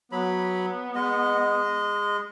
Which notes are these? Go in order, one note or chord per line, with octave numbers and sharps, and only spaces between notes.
F#3 B3 B5
G#3 D#5